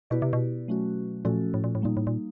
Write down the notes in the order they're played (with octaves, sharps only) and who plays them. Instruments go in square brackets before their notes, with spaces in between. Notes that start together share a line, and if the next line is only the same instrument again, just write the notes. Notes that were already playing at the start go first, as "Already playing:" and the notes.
[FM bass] B2 [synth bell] B3 E4 G4 B4 D5
[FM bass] C3
B2
[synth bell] F#3 A3 C#4 F#4
[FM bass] A#2 [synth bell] F3 A3 C#4 F#4 A4
[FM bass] A2
A#2
A2
[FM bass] A#2 [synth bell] G3 A#3 D#4
[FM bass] A2
A#2